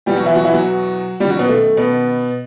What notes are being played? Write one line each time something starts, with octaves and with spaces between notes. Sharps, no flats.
E2 B2 G3 G4
F#3 F#4
E3 E4
F#3 F#4
E3 E4
F#3 F#4
F#2 D#3 G3 G4
F#3 F#4
B2 B3
A3
B2 B3